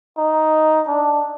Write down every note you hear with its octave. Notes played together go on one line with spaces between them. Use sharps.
D#4
D4